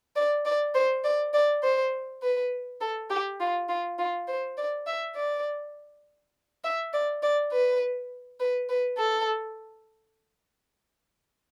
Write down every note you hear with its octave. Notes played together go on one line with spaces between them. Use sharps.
D5
D5
C5
D5
D5
C5
B4
A4
G4
F4
F4
F4
C5
D5
E5
D5
E5
D5
D5
B4
B4
B4
A4